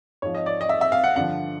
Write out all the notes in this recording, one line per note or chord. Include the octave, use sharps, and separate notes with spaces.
G#2 F3 C#5
D#5
D5
D#5
E5
E5
F5
F#5
G2 D3 F3 F#5